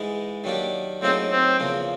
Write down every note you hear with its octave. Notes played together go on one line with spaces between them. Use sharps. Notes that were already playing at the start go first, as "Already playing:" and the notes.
Already playing: G#2 E3 G#3
D#3 F#3 A#3 D4 G4
A2 F#3 A#3 C4 D#4 G#4
C4
E2 C#3 F3 A#3